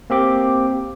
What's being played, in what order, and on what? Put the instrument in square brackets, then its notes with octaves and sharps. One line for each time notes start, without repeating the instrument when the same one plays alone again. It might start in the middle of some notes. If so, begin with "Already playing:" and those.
[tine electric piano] A#3 C4 G4 D6